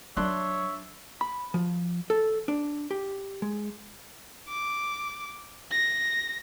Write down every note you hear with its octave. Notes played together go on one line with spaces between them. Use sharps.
F#3 D4 C#5 E5 C6 F#6
B5
F3
A4
D4
G4
G#3
D6
A#6